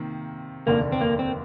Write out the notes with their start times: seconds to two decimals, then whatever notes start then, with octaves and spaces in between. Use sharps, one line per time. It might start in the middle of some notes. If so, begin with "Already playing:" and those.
Already playing: C3 D#3 A#3
0.66 F1 D#2 D3 A#3
0.92 C4
1.01 A#3
1.19 C4